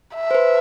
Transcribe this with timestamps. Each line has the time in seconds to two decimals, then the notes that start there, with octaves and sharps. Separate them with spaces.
0.16 E5
0.31 C5
0.35 B4